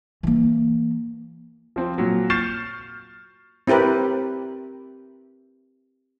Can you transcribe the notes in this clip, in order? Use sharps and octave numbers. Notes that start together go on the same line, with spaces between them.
E3 A#3
F3 C4
A#2 F#3
C#6 F6 G6 A6 C7 E7
C4 E4 G4 A#4 B4